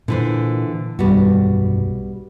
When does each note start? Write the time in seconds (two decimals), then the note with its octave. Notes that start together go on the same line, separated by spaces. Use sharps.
0.08 A#2 D3 E3 C5
0.99 B1 G2 G3 B3 F#4